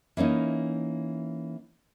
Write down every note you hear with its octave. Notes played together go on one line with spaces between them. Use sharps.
E3 A#3 C#4 D#4